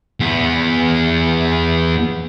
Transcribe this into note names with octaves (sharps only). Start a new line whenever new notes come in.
E2 B3